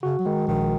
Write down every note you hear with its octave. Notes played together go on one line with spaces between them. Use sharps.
C#3 F#4
F#3
D#3 G#3
A#1 D#3